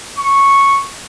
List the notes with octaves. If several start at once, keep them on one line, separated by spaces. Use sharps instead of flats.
C#6